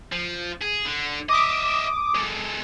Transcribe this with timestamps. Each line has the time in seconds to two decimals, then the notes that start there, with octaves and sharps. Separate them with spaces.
0.12 F3
0.62 G#4
0.86 D3
1.29 D#5 E5 D6 D#6
2.15 G#3 A4